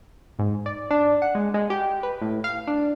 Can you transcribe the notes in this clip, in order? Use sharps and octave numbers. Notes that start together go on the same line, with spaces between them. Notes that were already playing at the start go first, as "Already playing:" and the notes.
G#2
D5
D4
F#5
G#3
G#3
G4
B4
A2
F5
D4